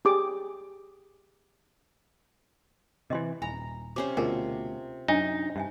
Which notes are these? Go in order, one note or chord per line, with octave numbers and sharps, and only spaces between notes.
G4 G#4 D6
C3 D#3 E3 D#5 E5 C6
D#1 G#5 A#5 B5
C3 C#4 C5 C#5 D6
D2 B2 F4 G#4 A#4 G#5
F#2 D4 D#4 G#5
G2 C#4 E5 G#5